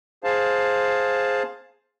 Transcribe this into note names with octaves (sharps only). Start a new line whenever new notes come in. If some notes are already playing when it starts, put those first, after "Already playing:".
G#4 C5 F5 A5